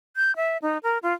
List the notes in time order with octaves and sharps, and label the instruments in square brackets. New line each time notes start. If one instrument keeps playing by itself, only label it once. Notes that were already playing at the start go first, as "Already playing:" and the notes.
[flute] G6
E5
D#4
A#4
F4